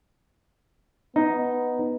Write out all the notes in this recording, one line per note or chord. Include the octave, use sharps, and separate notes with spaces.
B3 D#4